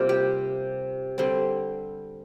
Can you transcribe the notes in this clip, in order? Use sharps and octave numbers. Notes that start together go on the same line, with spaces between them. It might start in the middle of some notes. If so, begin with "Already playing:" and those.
Already playing: C3 G3 A#3 F4
G4
D3 G3 C4